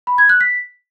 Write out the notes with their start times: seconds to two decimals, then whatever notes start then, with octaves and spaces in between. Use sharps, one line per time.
0.07 B5
0.18 G#6
0.29 F#6
0.41 B6